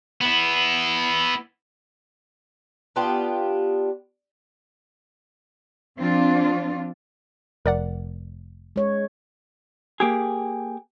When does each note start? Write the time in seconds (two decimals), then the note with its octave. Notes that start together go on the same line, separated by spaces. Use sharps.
0.21 B3 E4
2.96 B3 D4 F4 G4
5.97 F3 C4 D4 F4
7.66 F1 A#4 D5 F#5
8.76 G#3 C#5
10.00 A#3 G4 G#4